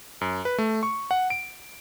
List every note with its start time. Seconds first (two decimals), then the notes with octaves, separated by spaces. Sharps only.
0.21 F#2
0.45 B4
0.58 A3
0.83 C#6
1.11 F#5
1.30 D7